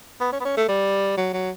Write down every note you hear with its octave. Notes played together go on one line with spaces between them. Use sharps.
B3
C#4
B3
C#4
A3
G3
F#3
F#3